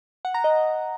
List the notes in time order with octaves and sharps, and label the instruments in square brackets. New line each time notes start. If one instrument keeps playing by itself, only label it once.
[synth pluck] F#5
A#5
D#5